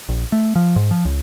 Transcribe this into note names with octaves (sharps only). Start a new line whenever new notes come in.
A#1
A3
F3
G#2
F3
C#2